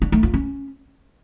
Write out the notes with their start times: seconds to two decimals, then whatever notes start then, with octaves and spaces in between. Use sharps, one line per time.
0.02 D4
0.12 A3
0.23 F4
0.34 C#4